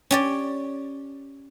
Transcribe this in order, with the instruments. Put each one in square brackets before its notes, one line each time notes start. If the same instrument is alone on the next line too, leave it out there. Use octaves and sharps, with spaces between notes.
[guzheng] C#4 G4 D5